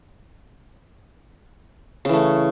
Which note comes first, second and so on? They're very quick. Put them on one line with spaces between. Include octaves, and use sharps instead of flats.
C#3 E3 A3